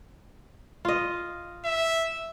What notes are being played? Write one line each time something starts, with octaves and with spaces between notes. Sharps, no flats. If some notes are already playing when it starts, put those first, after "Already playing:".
F4 D#5
E5